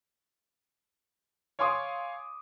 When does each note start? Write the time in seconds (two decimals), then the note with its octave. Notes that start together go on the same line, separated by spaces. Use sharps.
1.59 C#5 F5 G#5 C6 D6 D#6